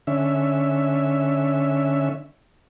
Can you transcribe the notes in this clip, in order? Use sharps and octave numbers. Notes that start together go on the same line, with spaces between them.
D3 C#4 E5